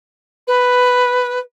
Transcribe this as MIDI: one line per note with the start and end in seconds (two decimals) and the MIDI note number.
0.48 1.39 71